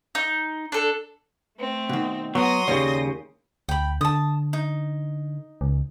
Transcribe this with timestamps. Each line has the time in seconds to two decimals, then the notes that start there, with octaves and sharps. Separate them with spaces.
0.15 D#4
0.72 D4 A4
1.57 A3 C4
1.89 B2 D#3
2.35 F#3 B3 C6 D#6 A#6
2.68 D#2 C#3 G3 C#5
3.69 D2 G5 B5
4.01 D3 A5 D#6
4.53 D#4
5.61 C#2